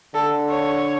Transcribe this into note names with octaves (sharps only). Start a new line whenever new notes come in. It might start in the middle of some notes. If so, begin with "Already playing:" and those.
D3 A4
C#5